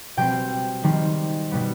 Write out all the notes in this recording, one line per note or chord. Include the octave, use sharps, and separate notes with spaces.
B2 G3 C4 G5
D#3 G3 C4
B2 G3 B3